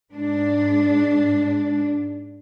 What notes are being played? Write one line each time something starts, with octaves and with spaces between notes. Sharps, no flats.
G#2 D4